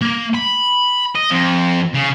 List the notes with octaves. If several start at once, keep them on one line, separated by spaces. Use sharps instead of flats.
A#3
B5
D#5
F2
C#3